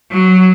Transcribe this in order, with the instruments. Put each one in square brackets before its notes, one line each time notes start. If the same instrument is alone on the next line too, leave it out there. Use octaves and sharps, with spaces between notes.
[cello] F#3